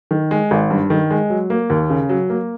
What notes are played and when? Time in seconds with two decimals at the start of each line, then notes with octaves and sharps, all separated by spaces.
0.11 D#3
0.31 G#3
0.51 G#1
0.70 G2
0.90 D#3
1.11 G#3
1.30 F#3
1.50 A#3
1.70 D#2
1.90 C#3
2.09 F#3
2.30 A#3